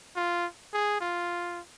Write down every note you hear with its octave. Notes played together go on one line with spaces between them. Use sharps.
F4
G#4
F4